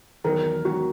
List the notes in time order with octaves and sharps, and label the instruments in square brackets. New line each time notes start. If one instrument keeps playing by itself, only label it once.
[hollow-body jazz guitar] E2 D#3 F#3 [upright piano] A#4
[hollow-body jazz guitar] E2 D#3 F#3 [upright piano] F#4